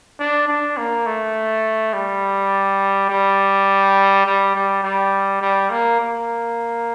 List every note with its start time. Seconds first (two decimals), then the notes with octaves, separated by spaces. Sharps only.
0.19 D4
0.48 D4
0.77 A#3
1.06 A3
1.93 G3
3.09 G3
4.26 G3
4.55 G3
4.83 G3
5.41 G3
5.70 A#3
6.00 A#3